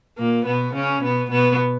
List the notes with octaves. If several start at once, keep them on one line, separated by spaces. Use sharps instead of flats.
A#2 A#3
B2 B3
C#3 C#4
B2 B3
B2 B3